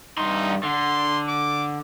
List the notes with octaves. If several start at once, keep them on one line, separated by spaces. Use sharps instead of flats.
G2 D#4 C6
D3 C6
D6